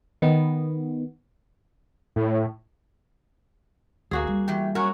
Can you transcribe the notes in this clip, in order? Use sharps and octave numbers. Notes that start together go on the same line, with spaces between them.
D#3 B3
A2
D2 A#3 F#4 G#4
G3
E2 E3 G4
F#3 C#4 F#4 A#4